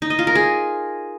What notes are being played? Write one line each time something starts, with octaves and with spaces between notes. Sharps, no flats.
D#4
D#5
F4
A#4
G#4